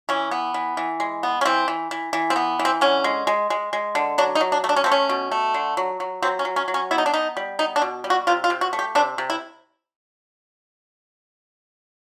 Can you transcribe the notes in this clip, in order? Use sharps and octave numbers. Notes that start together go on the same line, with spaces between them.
E3 C#4
B3
E3
E3
G#3
B3
C#4
E3 C4
E3
E3
E3
C4
B3
E3
C4
D3 C#4
G#3
G#3
G#3
G#3
D3
F#3 D4
D#4
F#3
D4
A3
D4
C#4
A3 C4
C#4
B2
A3
D3
F#3
F#3
F#3 C4
C#4
F#3
C#4
F#3
C#4
B3 E4
D#4
D4
B3 D#4
G3
B3 D#4
D4
B2
G3
F#4
C3 F4
F4
C3
F#4
A3
G4
C3 D4
C3
E4